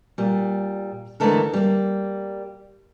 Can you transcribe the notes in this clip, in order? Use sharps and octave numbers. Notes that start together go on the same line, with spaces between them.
A#2 G3
D3 E3 G#3 A3 A4 A#4
G3 A#3